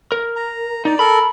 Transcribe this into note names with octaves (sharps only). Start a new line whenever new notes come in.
A#4
A#5
D#4 D5
A4 A#4 B5